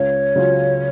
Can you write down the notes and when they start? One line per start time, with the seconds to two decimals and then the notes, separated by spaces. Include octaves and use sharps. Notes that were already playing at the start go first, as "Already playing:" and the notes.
Already playing: C#2 C#5
0.36 C#3 F#3 C#4 F4